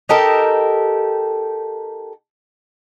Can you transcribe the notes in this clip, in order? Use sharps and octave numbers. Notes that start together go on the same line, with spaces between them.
D#4 G4 A4 A#4